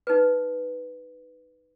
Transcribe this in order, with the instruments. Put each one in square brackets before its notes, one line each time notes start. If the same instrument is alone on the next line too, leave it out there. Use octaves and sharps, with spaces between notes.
[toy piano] D#4 B4